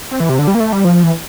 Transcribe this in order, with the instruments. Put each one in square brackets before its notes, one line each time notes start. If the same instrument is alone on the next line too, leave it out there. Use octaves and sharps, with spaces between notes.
[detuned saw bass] C4
E3
C3
D3
G3
A#3
A3
G3
F3
E3